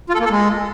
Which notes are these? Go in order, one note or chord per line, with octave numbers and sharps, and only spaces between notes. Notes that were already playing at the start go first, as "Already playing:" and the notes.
F4
A4
A#3
A4
G#3